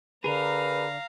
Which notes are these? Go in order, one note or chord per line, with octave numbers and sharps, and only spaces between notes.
D3 G#4 A#4 B4 F5 A#5